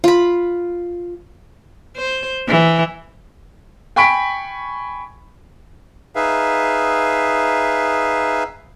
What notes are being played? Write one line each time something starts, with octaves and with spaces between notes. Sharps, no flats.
F4 B5
C5
E3
G5 G#5 B5 C#6 B6 D7
D#4 G#4 B4 E5 F5